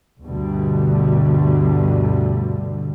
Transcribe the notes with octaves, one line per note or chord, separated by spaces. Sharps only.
D2 G2 B2 D3 G3